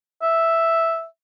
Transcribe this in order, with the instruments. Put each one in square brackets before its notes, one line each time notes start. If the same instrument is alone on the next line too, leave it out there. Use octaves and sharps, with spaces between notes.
[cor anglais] E5